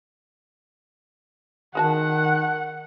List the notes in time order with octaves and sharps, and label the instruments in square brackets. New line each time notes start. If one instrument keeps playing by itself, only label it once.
[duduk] D#3 [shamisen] G#3 F#4 A5 [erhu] F#5